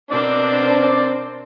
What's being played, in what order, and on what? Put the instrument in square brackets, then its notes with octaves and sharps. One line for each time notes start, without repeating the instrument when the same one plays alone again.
[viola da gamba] B2 A#4 C5 [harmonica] C4 D6 [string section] D4 [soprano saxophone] D5